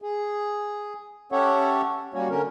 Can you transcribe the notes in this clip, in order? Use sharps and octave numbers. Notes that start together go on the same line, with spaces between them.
G#4
C#4 G4 A4 C#5 E5 F#5
G3 A#3 C#4 F#4 C#5
D3 C#4 A#4